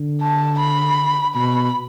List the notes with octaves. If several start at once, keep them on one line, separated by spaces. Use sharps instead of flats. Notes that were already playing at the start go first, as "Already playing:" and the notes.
Already playing: D3
A5
B5
B2 B5